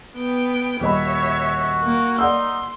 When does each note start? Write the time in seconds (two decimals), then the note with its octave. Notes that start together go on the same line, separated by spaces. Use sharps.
0.16 B3 G5
0.81 D#1 F#4 C#5 D#5 E5 B5
1.84 A#3
2.19 D#4 D5 F#5 C6 E6